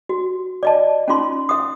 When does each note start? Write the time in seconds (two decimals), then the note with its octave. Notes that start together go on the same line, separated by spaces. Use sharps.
0.09 F#4
0.63 D5 D#5 A5
1.08 C#4 D#4 F4 C6
1.49 E5 D#6